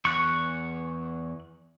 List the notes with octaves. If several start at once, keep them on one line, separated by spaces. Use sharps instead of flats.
E2 C#6 F#6